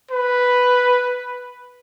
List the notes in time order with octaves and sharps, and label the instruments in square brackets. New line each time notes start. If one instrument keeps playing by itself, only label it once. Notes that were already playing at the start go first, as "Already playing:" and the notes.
[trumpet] B4